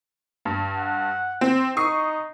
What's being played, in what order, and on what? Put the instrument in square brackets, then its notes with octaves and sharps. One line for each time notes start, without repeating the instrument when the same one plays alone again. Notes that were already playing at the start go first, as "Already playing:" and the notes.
[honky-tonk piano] G2
[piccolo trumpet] F#5
[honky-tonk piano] C4
[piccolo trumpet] D#4 [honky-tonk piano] C#6 D#6 C7